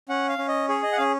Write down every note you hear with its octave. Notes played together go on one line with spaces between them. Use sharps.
C#4 F#5
F5
C#4
D#5
G#4 C#5
D#5
F#5
C#4 F5